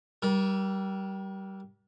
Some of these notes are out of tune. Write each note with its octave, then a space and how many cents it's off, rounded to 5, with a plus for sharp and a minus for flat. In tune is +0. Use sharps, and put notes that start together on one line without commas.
G3 -20 A#4 +35